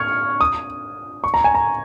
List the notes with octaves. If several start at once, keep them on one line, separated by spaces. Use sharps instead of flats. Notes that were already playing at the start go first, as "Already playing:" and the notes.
Already playing: C#6 F6 G#6
D#6
C#6
A#5
G#5
A#5